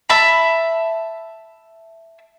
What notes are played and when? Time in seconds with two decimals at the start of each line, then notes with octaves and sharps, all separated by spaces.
0.10 E5 A5 B5